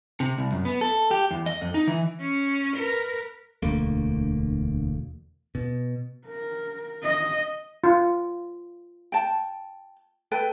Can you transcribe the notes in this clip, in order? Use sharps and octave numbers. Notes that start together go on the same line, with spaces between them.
C3
C2
F#2
B3
A4
G4
E2
D#5
F2
D#4
E3
C#4
A#4 B4
E1 D2 A3 A#3
B2
A#4
D#5
F4
G5 A5
A4 B4 G5